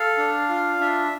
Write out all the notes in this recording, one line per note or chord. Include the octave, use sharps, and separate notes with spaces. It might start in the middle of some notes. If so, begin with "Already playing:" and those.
Already playing: A4 F5
D4
F4
D4 E5